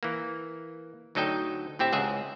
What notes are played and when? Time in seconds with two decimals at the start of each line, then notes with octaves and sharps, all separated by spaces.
0.03 E3 A#3
1.15 D2 F#3 D#4 A4 D#5 G5
1.79 A2 C4 G4 E5
1.92 C#2 G#4 E5 F#5